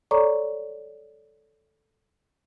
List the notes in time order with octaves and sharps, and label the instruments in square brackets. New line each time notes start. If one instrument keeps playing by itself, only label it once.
[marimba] A4 C#5 D5 A#5 C#6 D6